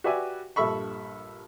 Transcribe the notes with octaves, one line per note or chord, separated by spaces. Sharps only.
F#4 G4 B4 D5 E5 G#5
A#1 G2 A4 E5 B5 C#6